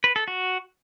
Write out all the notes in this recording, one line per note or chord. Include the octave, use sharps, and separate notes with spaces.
B4
A4
F#4